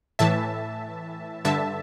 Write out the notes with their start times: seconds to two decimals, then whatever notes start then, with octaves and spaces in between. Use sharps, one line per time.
0.19 A2 E3 E5 A5
1.45 G2 D3 E5 A5